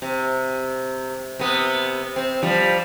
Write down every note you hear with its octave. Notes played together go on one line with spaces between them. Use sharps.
C3
C3 B3
C4
F3 G3